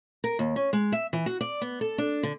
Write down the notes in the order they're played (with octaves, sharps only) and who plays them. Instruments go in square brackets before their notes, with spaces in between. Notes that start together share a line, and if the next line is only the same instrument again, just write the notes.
[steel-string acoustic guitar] A#4
D#2
C#4
G#3
E5
E3
F#4
D5
B3
A4
D4
D3